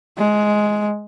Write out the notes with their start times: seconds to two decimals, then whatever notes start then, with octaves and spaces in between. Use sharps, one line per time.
0.18 G#3